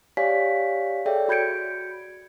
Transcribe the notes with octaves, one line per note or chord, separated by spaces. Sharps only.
G4 C#5 D5 F5 G#5 B6
G#4 A4 C#5 D5 E5 G5
F#4 B5 G6 G#6 C#7 D7